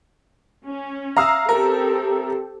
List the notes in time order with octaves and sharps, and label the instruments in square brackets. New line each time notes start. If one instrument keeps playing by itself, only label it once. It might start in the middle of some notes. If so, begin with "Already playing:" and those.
[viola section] C#4
[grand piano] E5 D#6 E6 [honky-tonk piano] F5 A#5
[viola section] C4 G4 A4 [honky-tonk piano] A#4